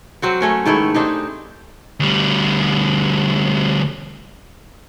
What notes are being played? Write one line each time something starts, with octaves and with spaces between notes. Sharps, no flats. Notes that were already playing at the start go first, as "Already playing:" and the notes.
F#3 C4 F#4
A3 C#4 A#4
G#2 D#3 A3 E4
C4 D4 D#4 G4
D2 G3